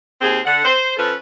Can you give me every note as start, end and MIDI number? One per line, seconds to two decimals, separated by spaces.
0.21 0.39 39
0.21 0.39 60
0.21 0.39 68
0.45 0.60 50
0.45 0.60 78
0.64 0.92 72
0.97 1.13 53
0.97 1.13 61
0.97 1.13 69
0.97 1.13 71